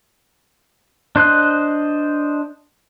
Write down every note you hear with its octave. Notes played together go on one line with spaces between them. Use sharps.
D4 C5 D#5 F#6